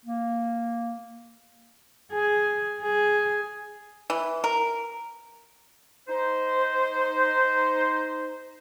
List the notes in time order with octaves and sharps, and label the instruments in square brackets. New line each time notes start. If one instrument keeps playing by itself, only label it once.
[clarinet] A#3
[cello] G#4
G#4
[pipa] E3
A#4
[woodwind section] D#4 C5